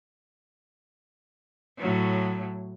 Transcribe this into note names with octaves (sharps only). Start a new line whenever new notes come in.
A2 F#3